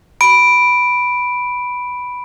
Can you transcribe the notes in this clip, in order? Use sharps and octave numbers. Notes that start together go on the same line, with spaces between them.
B5 D7